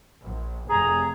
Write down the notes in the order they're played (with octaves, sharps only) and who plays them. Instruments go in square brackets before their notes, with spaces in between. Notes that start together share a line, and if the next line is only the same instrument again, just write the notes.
[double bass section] A#1
[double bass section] F1 [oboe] G#4 [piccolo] A#5